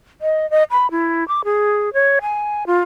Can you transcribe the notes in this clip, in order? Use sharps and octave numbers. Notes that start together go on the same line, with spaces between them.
D#5
D#5
B5
E4
D6
G#4
C#5
G#5
F4